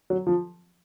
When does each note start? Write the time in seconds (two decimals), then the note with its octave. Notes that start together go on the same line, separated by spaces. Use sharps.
0.10 F#3
0.27 F3